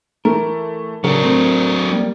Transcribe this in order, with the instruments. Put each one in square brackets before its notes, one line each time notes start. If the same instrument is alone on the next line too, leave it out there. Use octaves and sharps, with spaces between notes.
[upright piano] E3 A3 [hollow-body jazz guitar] A#4
[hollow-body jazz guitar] C#3 [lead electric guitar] F#3 D4 [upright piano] A#4
[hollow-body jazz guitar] A3 C4
[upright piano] G3 A#3 D5